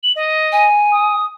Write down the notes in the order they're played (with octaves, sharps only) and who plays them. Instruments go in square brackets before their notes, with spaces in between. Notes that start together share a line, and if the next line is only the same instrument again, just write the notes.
[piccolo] F#7
D#5
[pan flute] G#5
[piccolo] D#6